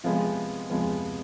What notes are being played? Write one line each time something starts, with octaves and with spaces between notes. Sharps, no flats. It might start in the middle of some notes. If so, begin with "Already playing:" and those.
C3 F3 G#3 B3
C3 F3 G#3 B3